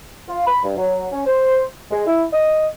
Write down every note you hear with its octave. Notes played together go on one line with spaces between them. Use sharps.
F4
B5
G2
F#3
C#4
C5
G#3
E4
D#5